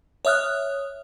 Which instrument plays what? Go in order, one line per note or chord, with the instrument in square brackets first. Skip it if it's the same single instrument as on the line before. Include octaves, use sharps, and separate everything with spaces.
[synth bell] C#5 E5 D#6 F6 F#6